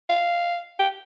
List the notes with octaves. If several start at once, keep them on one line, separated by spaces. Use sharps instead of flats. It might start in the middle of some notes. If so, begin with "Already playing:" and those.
F5
G5